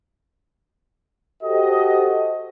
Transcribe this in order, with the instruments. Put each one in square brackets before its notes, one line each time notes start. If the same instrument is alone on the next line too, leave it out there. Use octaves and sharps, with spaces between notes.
[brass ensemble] F#4 G4 A4 C5 D#5